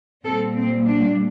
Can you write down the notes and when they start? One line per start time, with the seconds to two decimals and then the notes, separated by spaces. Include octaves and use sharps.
0.24 A#2 G3 C4 A4
0.54 C4
0.86 D4